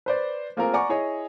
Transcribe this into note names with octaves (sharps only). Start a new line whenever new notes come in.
B4 C5 D5
A3 A#3 C4 F4 G#4 A#4
D5 F#5 G#5 A#5 C#6 D6
E4 G#4 C#5 D#5